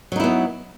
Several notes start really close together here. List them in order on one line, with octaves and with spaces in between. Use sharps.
F#3 D#4 E4 B3